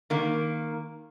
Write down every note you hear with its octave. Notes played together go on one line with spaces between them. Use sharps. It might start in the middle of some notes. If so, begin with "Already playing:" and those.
D#3 A#3